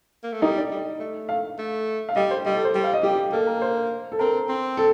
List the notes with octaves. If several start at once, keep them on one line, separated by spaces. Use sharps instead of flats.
A#3
A3
G3 D#4
D5
G3
A3
F5
A3
F5
G3 D#5
C5
G3 D#5
A4
C5
G3
F5
D#5
G3 G4
A#3 A4
A#4
C5
A4
C4 A#4
C4
A4